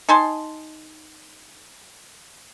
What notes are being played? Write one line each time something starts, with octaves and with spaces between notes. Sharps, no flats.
D#4 G#5 A5 C6